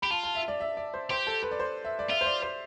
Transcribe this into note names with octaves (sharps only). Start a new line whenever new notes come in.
G4 B5
F4 A5
A5
E5
D5
E5
D5
C5
G4 C5
A4
B4
D5
C5
E5
D5
F4 E5
C5
D5
C5